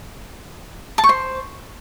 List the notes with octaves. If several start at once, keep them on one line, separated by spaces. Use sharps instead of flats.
A5
C#6
C5